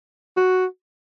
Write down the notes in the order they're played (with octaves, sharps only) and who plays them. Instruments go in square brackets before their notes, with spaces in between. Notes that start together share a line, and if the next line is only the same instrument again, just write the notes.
[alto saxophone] F#4